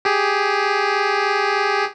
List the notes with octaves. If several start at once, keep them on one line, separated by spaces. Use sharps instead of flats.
G4 G#4